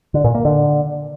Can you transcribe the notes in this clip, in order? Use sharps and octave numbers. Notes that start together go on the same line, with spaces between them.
D3
A#2
A#3
D3